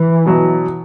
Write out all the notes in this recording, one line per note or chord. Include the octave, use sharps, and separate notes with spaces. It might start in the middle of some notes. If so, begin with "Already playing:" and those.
Already playing: E3
B2 F#3